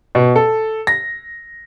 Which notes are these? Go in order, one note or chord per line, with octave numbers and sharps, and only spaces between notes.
B2
A4
A#6